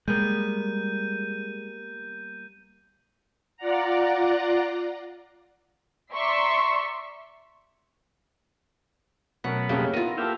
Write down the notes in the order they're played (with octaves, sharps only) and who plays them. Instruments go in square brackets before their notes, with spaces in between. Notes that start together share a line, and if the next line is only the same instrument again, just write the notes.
[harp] G3 A#3 B3 [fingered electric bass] G#3 [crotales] G6 D#7
[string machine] F4 D5 F#5 A#5
[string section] D5 E5 A#5 C6 C#6
[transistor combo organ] B2 F#3 B3 [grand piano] A3 C#4 A#4 [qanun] F#5
[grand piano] F2 C#3 A3 [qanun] A#3 [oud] C#4 G4
[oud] D#3 E4 [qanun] B3 F4 [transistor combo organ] A#5 [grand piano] D#7
[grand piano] A#3 G4 A4 [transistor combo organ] E5 F5 G5